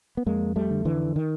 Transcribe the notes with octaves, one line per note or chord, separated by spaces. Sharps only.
B3
F2 G#3 A#3
G3 A3
D3
D3 E3
D#3